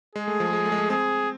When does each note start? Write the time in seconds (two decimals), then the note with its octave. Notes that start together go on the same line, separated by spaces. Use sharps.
0.15 G#3 G#4
0.28 A3
0.40 F3
0.53 G#3
0.66 A3
0.72 G#3
0.78 A3
0.90 C4 G#4